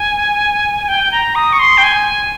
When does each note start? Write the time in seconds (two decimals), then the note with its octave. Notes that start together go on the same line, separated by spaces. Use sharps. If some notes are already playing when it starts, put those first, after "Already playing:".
Already playing: G#5
0.88 G5
1.12 A#5
1.35 D#6
1.53 C#6
1.59 C6
1.77 G5
1.83 G#5